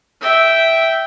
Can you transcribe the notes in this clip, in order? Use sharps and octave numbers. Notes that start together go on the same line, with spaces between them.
E5 G5